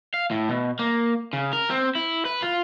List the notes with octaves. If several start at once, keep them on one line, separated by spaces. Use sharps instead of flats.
F5
A2
B2
A#3
C#3
A#4
C4
E4
B4
F4